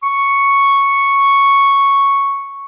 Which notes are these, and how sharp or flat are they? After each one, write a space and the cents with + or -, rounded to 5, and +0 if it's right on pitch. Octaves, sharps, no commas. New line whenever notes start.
C#6 +0